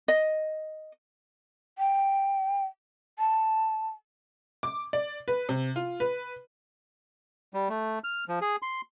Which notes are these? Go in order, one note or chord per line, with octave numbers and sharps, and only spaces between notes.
D#5
G5
A5
D6
D5
B4
C3
F4
B4
G3
A3
F6
F3
G#4
C6